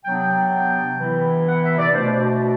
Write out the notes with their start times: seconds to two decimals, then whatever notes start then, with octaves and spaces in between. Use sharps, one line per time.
0.03 C3 F#3 B3 D4 G5
0.98 C3 E3 B3 E4
1.46 F#5
1.63 E5
1.78 D5
1.93 B2 A3 D4 C5
2.18 F#4